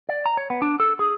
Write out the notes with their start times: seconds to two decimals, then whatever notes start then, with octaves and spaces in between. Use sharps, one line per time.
0.09 D5
0.26 A#5
0.37 C#5
0.50 B3
0.62 D4
0.80 A4
0.99 G#4